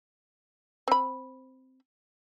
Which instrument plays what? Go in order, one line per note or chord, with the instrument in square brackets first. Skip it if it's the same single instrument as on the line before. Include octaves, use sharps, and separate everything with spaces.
[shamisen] C4 B5